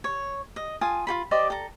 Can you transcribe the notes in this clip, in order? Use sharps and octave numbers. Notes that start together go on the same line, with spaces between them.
C#5
D#5
F4 G#5 A5 D#6
F4 A4 B5
G4 C5 D5 D#5
A4 A#5